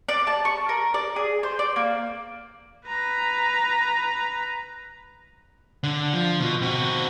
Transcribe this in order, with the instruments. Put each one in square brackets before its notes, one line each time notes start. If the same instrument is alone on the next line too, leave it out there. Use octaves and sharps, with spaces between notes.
[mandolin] D5
A5
C#6
A#4
D5
G#4
C5
D5
A#3
[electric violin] B4 A#5
[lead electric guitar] D3
F3
B2
C4 F#4